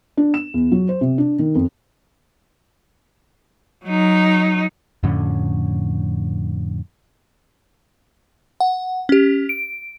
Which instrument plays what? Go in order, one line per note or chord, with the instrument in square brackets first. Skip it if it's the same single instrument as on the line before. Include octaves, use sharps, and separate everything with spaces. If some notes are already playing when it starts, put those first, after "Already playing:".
[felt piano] D4
E7
E2
F#3
C5
C3
D4
D#3
F2
[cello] F#3 D#4
[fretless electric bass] F2 A2 D3 C#4
[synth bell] F#5
C#4 G4
D7